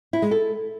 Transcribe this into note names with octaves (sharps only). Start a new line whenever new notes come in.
E4
G#3
A4